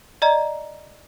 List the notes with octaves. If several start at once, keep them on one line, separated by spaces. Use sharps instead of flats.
D5 D#5 A#5